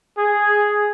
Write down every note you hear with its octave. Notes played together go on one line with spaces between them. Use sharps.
G#4